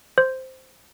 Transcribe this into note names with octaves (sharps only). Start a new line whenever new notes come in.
C5